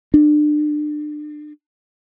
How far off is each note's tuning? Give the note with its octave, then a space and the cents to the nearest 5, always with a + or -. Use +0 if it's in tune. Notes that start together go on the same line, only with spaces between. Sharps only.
D4 +30